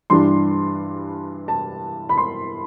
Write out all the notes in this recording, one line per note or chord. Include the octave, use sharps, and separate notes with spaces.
G2 E3 G3 D4 C6
A5
B5
C6